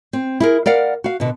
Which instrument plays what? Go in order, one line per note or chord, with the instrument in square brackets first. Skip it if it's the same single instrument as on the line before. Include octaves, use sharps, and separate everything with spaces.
[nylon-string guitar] C4
E4 G#4 A#4
A#4 D5 F5 F#5
F#4 F5
B2 D3